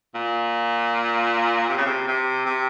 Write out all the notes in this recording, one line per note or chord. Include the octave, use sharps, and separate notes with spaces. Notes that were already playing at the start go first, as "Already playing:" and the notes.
A#2
C3
C#3
C3
C3
C3